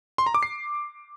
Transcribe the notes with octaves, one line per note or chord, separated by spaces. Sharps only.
C6
A#5
D6
C7